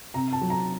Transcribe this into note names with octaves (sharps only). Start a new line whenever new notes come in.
C3 A#5
A5
F#3
A#5